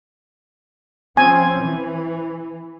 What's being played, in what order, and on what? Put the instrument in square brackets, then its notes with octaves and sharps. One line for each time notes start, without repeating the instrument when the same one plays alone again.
[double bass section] F3 C4 C#4 [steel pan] G#5
[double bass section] E3